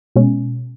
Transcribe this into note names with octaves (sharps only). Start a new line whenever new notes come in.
B2 G#3 C#4